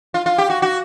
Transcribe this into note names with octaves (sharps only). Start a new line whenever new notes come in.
F4
F4
G4
F#4
F#4